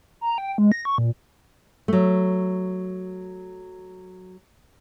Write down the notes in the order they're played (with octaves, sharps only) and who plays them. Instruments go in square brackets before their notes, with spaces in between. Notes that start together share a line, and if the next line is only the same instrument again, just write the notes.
[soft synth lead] A#5
G5
G#3
A#6
C#6
A#2
[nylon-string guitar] F#3 A3